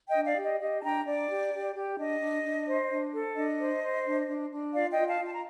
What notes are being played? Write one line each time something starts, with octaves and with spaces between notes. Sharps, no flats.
D#5 G5
D4
D5 F5
G4
D#5
G4 D#5
A5
D4 G5 A#5
D4 D5
G4
G4
G4
D4 D#5
D4
D4
C5
D4
A4
D4 D#5
C5
C5
D4
D4
D4
F4 D5 F5
D#5 G5
F4
F5 A5
F4
A5
A#5